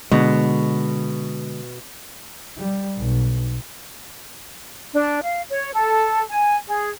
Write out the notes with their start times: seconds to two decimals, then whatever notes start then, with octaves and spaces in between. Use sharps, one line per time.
0.11 B2 D3 G#3
2.57 G3
2.97 B1
4.94 D4
5.23 F5
5.49 C#5
5.73 A4
6.29 G#5
6.66 G#4